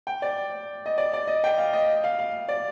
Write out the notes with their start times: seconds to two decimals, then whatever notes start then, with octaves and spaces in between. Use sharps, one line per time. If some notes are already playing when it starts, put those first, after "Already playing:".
0.07 G5
0.22 D5
0.86 D#5
0.98 D5
1.13 D5
1.27 D#5
1.44 G5
1.58 F5
1.73 D#5
2.04 F5
2.19 F5
2.49 D5